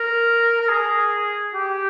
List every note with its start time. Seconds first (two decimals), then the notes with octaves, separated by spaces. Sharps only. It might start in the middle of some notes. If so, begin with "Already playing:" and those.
Already playing: A#4
0.61 A#4
0.69 G#4
1.54 G4